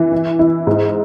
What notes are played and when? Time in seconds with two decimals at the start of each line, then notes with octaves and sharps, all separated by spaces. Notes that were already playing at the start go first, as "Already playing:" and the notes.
Already playing: E3
0.12 E4
0.39 E4
0.67 G#2